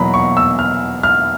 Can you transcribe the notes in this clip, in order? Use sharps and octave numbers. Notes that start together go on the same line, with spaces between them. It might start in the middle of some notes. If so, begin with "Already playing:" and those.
Already playing: E2 B2 F#3 A#3 A#5 B5
C#6
E6
F6
F6